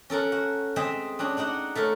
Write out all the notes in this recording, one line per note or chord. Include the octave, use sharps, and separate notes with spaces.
C#4 A4 A#4 F#5
F#4
G#3 C4 G#4 C5 E5
C#4 D4 F#4 G#4
D4 D#4 F#4 F#5
A3 A4 A#4 C#5